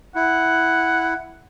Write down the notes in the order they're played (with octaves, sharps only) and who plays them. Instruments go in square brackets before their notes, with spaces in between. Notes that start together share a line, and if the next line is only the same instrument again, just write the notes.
[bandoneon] E4 [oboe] F#5